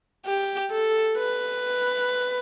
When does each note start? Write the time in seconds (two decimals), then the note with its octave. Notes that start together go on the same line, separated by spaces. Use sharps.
0.26 G4
0.71 A4
1.18 B4